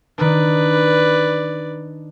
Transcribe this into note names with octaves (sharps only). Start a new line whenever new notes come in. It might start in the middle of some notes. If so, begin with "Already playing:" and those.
D#3 D4 B4 D5